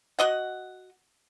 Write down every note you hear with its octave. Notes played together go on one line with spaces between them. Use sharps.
F#4 D#5 F#5